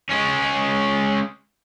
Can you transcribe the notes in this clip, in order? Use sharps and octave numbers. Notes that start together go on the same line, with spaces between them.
G#3 C#4